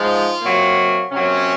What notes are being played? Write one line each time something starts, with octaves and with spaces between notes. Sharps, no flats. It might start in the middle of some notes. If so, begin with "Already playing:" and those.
Already playing: G#2 F3 G#3 F4
C3 F#3 A#3
C3 F#3 A#3 C#4